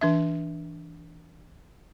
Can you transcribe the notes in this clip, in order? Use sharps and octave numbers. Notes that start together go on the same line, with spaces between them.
E3 D4 E5